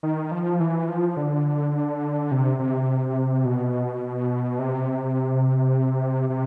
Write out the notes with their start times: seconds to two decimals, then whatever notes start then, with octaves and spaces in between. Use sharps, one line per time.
0.03 D#3
0.31 F3
0.60 E3
0.88 F3
1.17 D3
2.32 C3
2.59 C3
3.45 B2
4.59 C3
6.30 C3